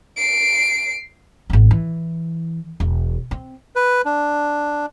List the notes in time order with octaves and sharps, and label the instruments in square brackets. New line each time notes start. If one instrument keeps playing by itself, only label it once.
[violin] C7 D7
[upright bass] G#1 B3
E3
E1
C4
[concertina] B4
D4